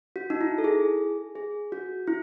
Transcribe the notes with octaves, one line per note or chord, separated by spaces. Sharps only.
F#4
D#4
E4
A4
G#4
G#4
F#4
E4